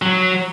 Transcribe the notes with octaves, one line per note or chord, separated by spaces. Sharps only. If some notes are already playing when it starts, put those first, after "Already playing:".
F#3